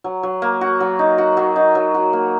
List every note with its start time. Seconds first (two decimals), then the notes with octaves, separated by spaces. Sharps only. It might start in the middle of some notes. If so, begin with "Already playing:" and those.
0.04 F#3
0.23 F#3
0.42 A#3
0.61 F#4
0.80 F#3
0.99 D#4
1.18 F#4
1.37 F#3
1.56 D#4
1.75 F#3
1.94 F#4
2.13 A#3